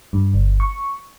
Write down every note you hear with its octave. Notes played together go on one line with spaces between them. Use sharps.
G2
G1
C#6